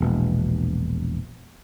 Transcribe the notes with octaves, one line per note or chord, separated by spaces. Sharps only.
E1 A#1 B2